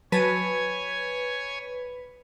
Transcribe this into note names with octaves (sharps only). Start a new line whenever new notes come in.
F#3 B4 C#5 G#5 A5 D#7